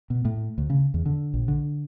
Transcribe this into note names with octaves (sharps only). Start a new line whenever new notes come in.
B2
A2
D2
C#3
E2
D3
A#1
D3